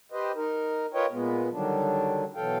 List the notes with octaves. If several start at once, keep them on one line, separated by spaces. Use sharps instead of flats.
G4 B4 C5 D#5
D#4 A#4
F4 A#4 B4 C#5 D#5 G5
A#2 G#3 B3
D3 D#3 F#3 G3 D4
B2 E3 F#3 A4 F5 G5